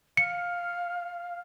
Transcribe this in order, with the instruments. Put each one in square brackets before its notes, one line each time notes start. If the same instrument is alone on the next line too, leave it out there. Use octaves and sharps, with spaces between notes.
[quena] F5 [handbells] C#7